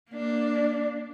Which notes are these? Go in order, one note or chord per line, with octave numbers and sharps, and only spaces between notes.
A#3 D4